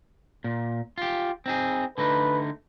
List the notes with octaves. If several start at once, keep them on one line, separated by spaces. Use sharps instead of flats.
A#2
F4 G4
C4 D#4 G#4
D3 A3 D#4 B4